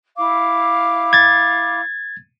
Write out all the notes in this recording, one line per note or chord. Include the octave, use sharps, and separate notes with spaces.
E4 F5 D6
G#6 A6